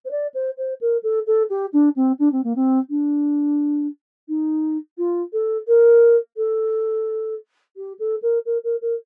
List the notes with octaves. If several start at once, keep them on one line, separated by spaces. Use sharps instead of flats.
C5
D5
C5
C5
A#4
A4
A4
G4
D4
C4
D4
C4
A#3
C4
D4
D#4
F4
A4
A#4
A4
G4
A4
A#4
A#4
A#4
A#4